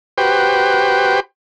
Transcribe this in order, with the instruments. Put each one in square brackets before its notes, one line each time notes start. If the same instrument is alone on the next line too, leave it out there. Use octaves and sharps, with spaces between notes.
[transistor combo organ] F#4 G4 B4 C5 G5